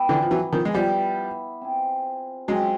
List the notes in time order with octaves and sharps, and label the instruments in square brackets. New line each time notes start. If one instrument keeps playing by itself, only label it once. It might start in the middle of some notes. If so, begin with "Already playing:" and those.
Already playing: [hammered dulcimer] B3 E4 G4
[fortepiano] D3 E3
F3
E3 F#3
D#3 F3
G#3
[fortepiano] F3 G3 [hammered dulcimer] B3 E4 G4
[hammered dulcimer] C4 F4 G#4
[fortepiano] F#3 G#3 [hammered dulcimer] C4 F4 G#4